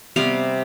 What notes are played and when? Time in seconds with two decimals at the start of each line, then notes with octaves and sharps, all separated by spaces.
0.16 C3 G3 B3 F5